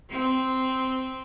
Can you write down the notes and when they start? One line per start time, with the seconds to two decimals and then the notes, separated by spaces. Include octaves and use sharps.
0.11 C4